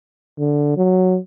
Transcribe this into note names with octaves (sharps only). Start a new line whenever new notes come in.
D3
F#3